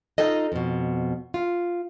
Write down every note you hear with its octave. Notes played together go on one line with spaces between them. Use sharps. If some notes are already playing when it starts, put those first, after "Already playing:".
D#4 F4 A4 D#5
F2 B2
F4